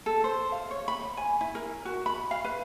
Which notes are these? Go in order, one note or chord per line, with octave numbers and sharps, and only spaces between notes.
A4
C5
F5
C#5
B5
G#5
E4
A#4
F#4
B5
F5
B4